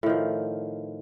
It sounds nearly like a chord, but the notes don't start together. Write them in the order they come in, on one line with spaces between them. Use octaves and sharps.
A2 D#3 F3